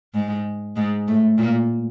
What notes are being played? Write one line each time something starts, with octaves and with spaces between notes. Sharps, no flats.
G#2 G#3
G#2 G#3
A2 A3
A#2 A#3